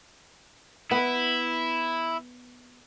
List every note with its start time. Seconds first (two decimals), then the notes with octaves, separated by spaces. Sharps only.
0.91 B3 E4